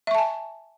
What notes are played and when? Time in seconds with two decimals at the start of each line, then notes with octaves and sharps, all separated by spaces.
0.07 E5
0.11 C#6
0.15 A5
0.18 G#5